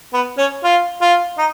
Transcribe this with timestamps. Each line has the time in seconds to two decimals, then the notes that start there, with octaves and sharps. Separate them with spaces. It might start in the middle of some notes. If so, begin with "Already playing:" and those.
0.13 B3
0.38 C#4
0.64 F4
1.01 F4
1.38 D#4